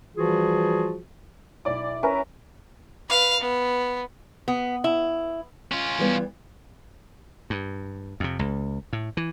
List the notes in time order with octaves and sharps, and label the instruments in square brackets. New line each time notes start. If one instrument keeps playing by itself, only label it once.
[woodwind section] E3 F3 G3 F4 F#4 G#4
[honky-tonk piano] B1 D5 D6 [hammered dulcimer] E4
[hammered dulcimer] C#4 A#5 [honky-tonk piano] A#4 B4 E5
[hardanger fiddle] B4 F5
B3
[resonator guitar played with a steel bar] B3
E4
[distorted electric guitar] C#4 F4
[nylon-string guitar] E3 G3 B3
[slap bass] G2
F2 C3
C#2
A2
E3